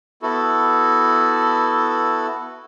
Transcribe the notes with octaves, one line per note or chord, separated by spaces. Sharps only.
B3 E4 F#4 A4